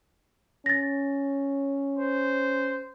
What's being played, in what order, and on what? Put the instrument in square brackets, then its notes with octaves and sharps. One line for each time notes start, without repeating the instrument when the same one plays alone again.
[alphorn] C#4 [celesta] A6 A#6
[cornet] C5